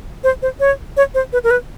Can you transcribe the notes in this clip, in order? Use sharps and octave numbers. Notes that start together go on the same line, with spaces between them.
C5
C5
C#5
C#5
C5
B4
A#4
B4